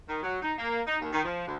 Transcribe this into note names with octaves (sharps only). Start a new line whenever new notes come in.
D#3
F#3
D#4
A#3
D#4
D#2
D#3
F3
D2